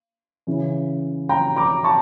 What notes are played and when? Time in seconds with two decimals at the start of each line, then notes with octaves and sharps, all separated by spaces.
0.47 C#3 E3
1.29 G5 A#5
1.56 A#5 D6
1.84 A5 C#6